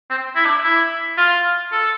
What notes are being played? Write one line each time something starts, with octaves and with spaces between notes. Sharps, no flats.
C4
E4
D4
E4
F4
A4